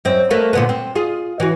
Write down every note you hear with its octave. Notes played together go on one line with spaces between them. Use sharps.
F#2 C4
A3 A#3 B4
A#2 D3 B3
C4
F4 G#4
E3 F#4